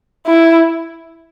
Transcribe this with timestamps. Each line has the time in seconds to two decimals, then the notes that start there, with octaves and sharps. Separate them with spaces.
0.26 E4